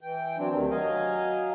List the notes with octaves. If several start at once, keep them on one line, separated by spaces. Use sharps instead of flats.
E3 G5
F#3 C4 D4
D2 C3 D#3
F#3 D#5 F5 G#5